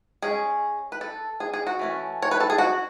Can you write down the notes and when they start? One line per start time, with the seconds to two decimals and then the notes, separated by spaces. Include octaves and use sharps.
0.22 G#3 C#4 G#4
0.92 B4
1.01 A4
1.40 G#4
1.53 G#4
1.67 F#4
1.79 E3 A3 C#4
2.22 C#5
2.31 B4
2.40 A4
2.50 G#4
2.58 F#4